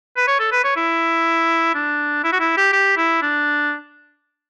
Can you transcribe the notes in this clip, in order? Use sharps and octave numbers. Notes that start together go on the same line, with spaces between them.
B4
C#5
A4
B4
C#5
E4
D4
E4
F#4
E4
G4
G4
E4
D4